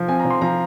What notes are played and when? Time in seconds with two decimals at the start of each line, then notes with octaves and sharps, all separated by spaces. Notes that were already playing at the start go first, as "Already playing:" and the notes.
Already playing: F3
0.08 C4 G#5
0.19 A#5
0.25 F3
0.30 C6
0.41 F3 A#5